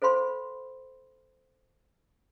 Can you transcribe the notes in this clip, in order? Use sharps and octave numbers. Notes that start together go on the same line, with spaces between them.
A4 C5 F5 B5 C6